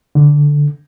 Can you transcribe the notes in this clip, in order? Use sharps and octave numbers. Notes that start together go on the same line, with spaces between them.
D3